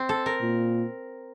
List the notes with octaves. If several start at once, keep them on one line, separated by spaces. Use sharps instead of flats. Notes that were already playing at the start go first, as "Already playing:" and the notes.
Already playing: C4
A4
A#4
A#2